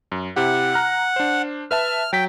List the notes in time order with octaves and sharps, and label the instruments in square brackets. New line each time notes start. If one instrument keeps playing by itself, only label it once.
[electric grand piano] F#2
[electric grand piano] C3 E4 G4 [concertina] F#5
[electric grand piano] A#5 F6 F#6
D4 C5
[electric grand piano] B4 E5 A5 [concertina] F6
[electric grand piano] F#3 B6 [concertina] G5